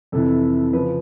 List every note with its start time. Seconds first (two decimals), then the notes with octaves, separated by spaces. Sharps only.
0.12 F2 C3 E3 A4
0.73 C#3 F3 B4